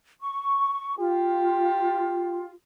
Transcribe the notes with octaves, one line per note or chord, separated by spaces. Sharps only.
C#6
F4 G4